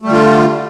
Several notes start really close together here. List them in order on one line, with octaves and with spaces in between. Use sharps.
A3 G3 D3 F4